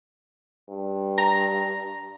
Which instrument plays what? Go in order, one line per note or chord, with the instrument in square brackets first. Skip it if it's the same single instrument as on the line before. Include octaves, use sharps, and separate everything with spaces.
[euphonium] G2
[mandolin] A#5